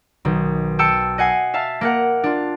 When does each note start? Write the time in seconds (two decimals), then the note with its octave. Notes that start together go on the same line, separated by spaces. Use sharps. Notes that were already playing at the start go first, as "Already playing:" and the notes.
0.25 B1 D#3
0.79 G5 A5 E6 C#7
1.18 D#5 F#5 G#5 C7
1.54 E5 F5 A5
1.81 A#3 A#4 F#5
2.24 D4 F4